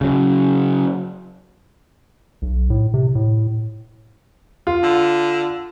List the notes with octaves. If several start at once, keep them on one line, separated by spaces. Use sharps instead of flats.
C#3 F#3
B1
A2
C3
A2
F4
D3